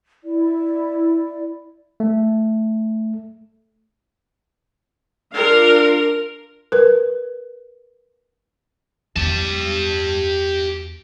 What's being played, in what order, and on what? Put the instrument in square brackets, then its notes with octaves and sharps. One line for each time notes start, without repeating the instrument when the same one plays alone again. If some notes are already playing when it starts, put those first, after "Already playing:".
[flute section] E4 D5
[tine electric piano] A3
[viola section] D4 F4 F5 [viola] A#4
[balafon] A#4 B4
[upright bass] E2 B3 [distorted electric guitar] G4 A5